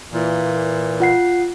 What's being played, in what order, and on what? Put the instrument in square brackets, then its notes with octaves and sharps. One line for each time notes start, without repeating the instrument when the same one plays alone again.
[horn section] A#2 E3
[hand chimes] F4 F#5 C7